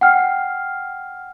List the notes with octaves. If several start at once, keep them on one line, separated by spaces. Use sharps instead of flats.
F#5 G5 F6 C7